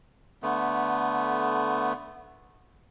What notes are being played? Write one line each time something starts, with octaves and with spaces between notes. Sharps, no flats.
D3 A3 B3